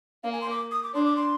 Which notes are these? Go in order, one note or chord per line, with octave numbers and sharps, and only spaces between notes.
A#3 F5
G#5
C6
D6
D#6
D6
D4 C6
D6
C6